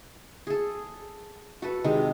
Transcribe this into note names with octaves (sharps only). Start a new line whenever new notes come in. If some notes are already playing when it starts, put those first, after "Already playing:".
G#4 A4
F#4 A4 B4
C3 D#3 G#3